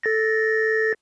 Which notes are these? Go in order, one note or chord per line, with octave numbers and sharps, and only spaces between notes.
A4 A6 A#6